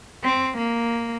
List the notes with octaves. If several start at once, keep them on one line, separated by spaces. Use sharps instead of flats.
C4
A#3